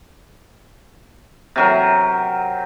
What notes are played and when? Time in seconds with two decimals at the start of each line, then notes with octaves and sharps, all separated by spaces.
1.56 C3 F#3 A#4